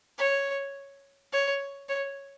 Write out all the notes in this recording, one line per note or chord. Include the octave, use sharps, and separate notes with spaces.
C#5
C#5
C#5